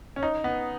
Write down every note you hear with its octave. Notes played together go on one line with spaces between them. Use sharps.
C#4
D#4
B3